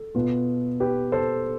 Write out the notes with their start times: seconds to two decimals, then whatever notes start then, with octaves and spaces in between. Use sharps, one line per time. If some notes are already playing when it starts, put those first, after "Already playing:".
Already playing: A4
0.15 B2 B3 F4
0.80 G4 B4
1.12 A4 C5